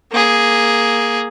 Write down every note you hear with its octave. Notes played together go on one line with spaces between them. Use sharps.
A#3 G#4